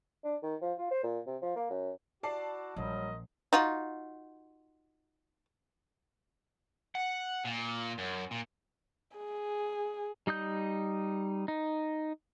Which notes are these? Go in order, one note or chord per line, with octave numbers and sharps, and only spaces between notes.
D4
D#3
F3
F4
C5
A#2
C3
F3
A#3
F#2
E4 F#4 D5 A5 C7
A#1 F#3 G3 A#4 C5 D#5
D#4 F4 F#4
F#5
A#2
F#2
A#2
G#4
G3 D#4 D#6 G6
D#4